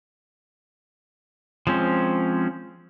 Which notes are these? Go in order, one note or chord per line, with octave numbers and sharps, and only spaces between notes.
F3 G#3 C4 C#4